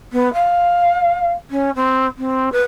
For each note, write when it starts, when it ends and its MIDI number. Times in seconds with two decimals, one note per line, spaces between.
0.13 0.32 59
0.33 1.31 77
1.50 1.70 61
1.76 2.06 60
2.18 2.52 60
2.52 2.61 71